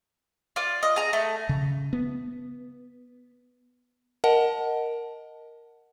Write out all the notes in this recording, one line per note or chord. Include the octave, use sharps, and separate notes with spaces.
F4 D5
D#5
G#4 A#5
A3
C#3
B3
A#4 D#5 F#5 A5